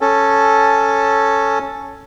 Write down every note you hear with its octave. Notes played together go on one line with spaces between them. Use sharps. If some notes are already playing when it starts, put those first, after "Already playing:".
C#4 A4